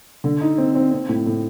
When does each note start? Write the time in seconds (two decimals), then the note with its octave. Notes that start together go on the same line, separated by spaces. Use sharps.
0.24 D3
0.41 D#4
0.58 C4
0.75 C4
0.92 C4
1.09 A2
1.26 A2